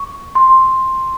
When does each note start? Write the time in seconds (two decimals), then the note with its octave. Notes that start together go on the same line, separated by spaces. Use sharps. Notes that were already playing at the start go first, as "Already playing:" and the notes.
Already playing: C#6
0.35 C6